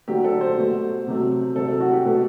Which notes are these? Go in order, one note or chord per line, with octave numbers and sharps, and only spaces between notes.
D3 F#3 A3 G4
A4
C5
B2 A3
C3 F#3 A3
C3 F#3 A3 A4
A4
F#4
G4
B2 A3 A4